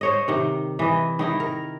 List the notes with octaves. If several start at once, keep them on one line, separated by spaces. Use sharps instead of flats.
C5 C#5 D#5
C3 D#3
E3 D#5
D#3 D#4 E4
A#4